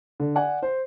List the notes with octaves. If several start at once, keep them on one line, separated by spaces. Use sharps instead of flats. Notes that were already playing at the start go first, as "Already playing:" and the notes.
D3
D5 F#5 G#5
C5